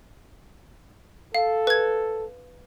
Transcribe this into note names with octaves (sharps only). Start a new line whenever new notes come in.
A4 F5
B4 G#6